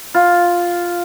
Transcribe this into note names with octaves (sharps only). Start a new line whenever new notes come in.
F4